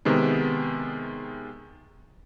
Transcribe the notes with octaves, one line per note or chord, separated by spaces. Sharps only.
C3 D#3 G#3 B3